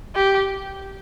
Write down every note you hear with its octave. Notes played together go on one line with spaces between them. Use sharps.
G4